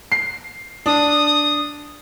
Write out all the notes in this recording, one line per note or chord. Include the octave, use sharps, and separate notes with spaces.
C7
D4 D#6